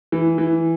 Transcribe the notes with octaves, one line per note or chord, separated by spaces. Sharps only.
E3
E3